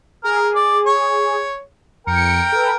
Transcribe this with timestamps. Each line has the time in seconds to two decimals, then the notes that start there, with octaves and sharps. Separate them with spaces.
0.24 G#4 A#4 F6
0.55 D5
0.86 C#5
2.07 F2 A#4 G5 C#7
2.52 A4 B4